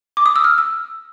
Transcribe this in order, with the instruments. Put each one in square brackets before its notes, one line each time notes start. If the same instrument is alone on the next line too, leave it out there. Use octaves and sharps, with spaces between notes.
[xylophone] D6
D#6
E6
F6
E6